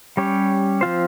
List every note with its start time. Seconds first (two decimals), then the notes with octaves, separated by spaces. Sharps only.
0.17 G3 C#4 G4 C#5
0.81 F3 C4 F4 C5